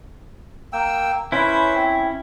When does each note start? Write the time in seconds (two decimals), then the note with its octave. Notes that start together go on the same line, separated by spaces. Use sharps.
0.73 A#3 G5 E6
1.32 C#4 E4 B4 C5
1.75 C4